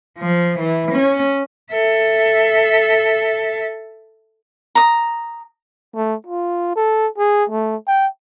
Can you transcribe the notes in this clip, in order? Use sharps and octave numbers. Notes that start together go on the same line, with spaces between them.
F3
E3
C#4
A4 E5
A#5 D#6
A3
F4
A4
G#4
A3
G5